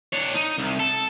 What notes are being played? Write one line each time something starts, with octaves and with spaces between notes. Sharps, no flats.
D4 C#5
D#4
C2
A4